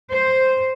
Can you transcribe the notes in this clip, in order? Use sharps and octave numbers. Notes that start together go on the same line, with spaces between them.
C5